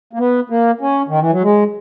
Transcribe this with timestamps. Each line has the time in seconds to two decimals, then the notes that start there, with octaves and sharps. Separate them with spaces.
0.13 A#3
0.19 B3
0.50 A#3
0.81 C#4
1.08 D#3
1.20 E3
1.31 F#3
1.42 G#3